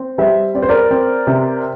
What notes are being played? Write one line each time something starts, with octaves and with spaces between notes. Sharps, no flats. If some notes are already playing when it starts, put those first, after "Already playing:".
Already playing: C4
G3 C5 E5
C4 D5
C5
A#4 D5
C4
C3